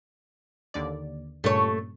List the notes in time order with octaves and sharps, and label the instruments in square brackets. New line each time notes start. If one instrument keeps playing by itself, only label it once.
[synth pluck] D#2 D3 D5
[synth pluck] G2 A#2 C#3 [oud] A3 C#5